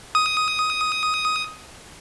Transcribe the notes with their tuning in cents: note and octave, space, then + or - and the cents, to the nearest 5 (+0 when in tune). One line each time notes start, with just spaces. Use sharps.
D#6 +10